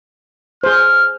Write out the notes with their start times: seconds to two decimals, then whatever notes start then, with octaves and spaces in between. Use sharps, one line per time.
0.64 G#4 C5 F6